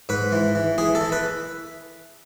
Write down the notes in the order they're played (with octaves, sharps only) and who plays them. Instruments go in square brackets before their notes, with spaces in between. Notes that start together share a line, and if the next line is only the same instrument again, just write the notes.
[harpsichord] G#2 B4
E3
E3
E3 G#4
A4
E3
B4